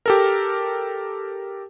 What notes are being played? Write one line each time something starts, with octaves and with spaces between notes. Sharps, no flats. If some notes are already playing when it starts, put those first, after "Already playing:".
G4 A4 A#4